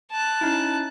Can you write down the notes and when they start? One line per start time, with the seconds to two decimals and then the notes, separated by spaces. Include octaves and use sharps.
0.11 A5 F#6
0.41 C#4 D#4 E4